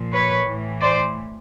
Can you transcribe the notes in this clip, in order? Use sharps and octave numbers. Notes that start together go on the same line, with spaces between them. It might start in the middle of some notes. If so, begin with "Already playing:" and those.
Already playing: A#2 F3
B4 C#5
A2 E3
C5 D5